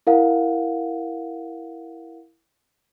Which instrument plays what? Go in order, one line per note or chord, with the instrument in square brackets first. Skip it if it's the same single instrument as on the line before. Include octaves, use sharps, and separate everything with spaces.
[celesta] E4 A#4 F5 F#5